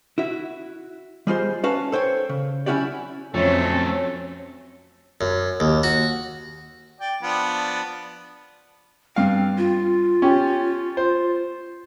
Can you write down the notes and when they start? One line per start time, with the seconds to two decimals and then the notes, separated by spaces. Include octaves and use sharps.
0.18 E4 F#4 E5
1.27 G3 G#3 F4 C5
1.63 C#4 F#4 B4 F5 A5
1.92 A4 C5 C#5 G5
2.29 C#3
2.66 F#3 C#4 E4 F#4 G4 D5
3.34 F2 F#3 A3 C4 C#4 A4
5.21 F#2
5.60 D#2
5.83 F#4
7.00 D5 G5
7.23 F3 B3 D4
9.16 G2 C4 F5
9.57 F4
10.22 C#4 G4
10.97 C5